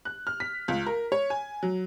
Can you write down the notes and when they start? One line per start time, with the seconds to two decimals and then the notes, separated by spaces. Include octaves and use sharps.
0.05 F#6
0.27 F6
0.40 B6
0.68 C#2
0.86 A#4
1.12 C#5
1.30 G#5
1.63 F#3